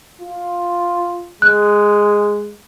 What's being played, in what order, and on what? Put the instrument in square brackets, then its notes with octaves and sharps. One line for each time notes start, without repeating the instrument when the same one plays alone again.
[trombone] F4
[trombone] G#3 [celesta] F#6